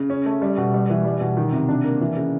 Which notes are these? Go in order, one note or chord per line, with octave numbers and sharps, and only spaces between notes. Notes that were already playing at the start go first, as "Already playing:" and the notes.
Already playing: C#3
C#4
A3
G3
B2
G3
E3
G3
B2
D#3
C3
D4
A#3
E3
C#3